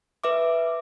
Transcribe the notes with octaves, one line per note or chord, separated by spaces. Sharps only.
B4 E5 D6